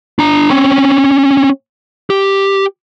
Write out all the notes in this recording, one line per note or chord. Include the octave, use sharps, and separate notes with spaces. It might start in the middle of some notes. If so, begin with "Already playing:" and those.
D4 A#5
C4 C#4
G4